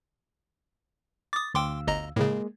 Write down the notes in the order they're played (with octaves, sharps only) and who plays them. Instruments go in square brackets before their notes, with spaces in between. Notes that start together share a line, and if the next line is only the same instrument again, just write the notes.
[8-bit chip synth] D6 D#6 [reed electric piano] A6
[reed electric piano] D2 F5 E6 [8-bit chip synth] G5 C6 D6
[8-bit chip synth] G1 D#5 A#5
[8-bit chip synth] A2 C#3 [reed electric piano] G#3 A#3